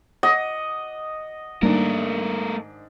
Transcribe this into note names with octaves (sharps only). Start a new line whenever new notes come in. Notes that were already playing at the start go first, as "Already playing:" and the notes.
D#5 F#5
G#2 D#3 G3 A3 A#3 D4 A#4